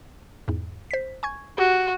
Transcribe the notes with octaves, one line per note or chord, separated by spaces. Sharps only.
E2 G#2
C5 B6
G#5 C#6 G#6
F#4 G4